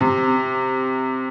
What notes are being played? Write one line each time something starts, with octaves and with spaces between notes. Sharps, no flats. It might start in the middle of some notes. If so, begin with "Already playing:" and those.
C3